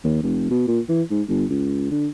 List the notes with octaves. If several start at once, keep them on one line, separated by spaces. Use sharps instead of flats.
D#2
F1
B2
A#2
E3
G#2
G1
C#2
D3